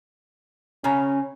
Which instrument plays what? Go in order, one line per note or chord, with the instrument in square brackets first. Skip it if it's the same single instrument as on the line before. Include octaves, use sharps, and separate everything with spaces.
[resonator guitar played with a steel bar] C#3 A#5 [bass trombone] C#4